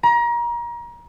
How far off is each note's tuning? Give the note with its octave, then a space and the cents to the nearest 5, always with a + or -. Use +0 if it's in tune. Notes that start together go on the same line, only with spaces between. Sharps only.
A#5 +30